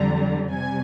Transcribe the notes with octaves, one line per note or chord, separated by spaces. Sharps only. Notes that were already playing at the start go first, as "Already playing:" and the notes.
Already playing: F2 D3 G3 A#5
C3 G3 G#5